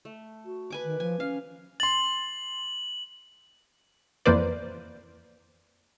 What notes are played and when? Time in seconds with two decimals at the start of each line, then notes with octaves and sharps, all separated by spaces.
0.05 A3
0.46 F#4
0.70 B4 G#5 D6
0.84 D#3
1.00 F3 G#5
1.20 C#4 F5
1.80 C6 A6 F#7
4.26 F2 E3 A#3 B4 C5 D5